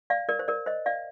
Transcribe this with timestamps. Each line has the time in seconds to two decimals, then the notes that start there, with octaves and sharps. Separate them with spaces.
0.10 D5 F5
0.29 A#4 D5
0.39 C5
0.48 A#4 D5
0.66 C5 D#5
0.86 D5 F5